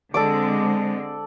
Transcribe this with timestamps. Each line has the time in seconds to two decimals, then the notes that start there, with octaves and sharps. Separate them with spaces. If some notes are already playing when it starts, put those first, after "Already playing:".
0.14 D3 G#3 C4 A4 D5 D6